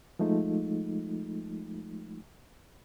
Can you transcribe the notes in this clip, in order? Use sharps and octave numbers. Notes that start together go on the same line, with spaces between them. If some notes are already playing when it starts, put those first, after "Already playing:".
F3 G#3 A3 D#4 F4